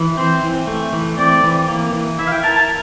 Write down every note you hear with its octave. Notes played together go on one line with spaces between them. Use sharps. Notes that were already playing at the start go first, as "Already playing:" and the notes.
Already playing: E3
C4 C5
E3
A3
E3
C4 D5
E3
A#3
E3
E4 E5
F5
G5
A#4 A5
A5